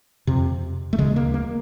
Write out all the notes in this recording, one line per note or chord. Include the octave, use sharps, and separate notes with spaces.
F2 C3
A3
D2 C#3 G#3
A#3
A#3